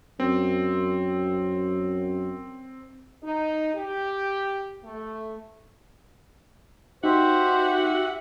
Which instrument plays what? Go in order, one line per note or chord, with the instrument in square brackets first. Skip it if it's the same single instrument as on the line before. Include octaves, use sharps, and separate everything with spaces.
[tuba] F#2 [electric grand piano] C4
[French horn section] D#4
G4
A3
[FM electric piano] D#4 [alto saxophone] F#4 [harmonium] G4 E5 [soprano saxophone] C5